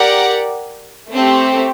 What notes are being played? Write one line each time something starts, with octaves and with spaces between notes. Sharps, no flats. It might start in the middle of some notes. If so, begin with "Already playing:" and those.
Already playing: G4 A#4 D5 F#5
A3 C4 G4